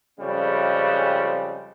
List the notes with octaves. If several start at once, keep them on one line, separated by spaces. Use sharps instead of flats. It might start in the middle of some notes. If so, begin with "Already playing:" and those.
F2 C#3 G3 G#3